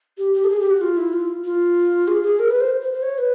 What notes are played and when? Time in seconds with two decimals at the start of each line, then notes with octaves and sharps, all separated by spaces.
0.18 G4
0.33 G4
0.44 A4
0.49 G#4
0.60 G4
0.71 F#4
0.81 F4
0.97 E4
1.13 F4
1.44 F4
2.08 G#4
2.24 G#4
2.39 A#4
2.50 B4
2.61 C5
2.82 C5
2.93 C5
3.03 C#5
3.18 B4